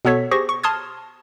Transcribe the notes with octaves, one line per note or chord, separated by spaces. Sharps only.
B2 B3 A4 C#5 B6
G4 G#4 C5 C#6 A#6
C#6
A5 C6 D#6 F6 G#6